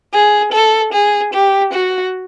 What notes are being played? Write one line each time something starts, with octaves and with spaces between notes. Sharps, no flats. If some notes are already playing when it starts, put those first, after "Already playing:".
G#4
A4
G#4
G4
F#4